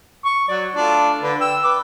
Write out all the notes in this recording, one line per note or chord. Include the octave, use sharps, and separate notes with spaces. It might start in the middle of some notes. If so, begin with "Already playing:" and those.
C#6
F#3 D5
A3 D4 F4
D3 B4
G5 E6
B4 D6